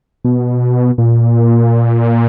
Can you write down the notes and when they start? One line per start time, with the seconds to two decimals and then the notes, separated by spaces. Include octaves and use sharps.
0.25 B2
0.98 A#2